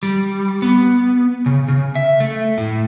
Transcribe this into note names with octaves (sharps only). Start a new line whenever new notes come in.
G3
B3
C#3
C#3
E5
A3
A2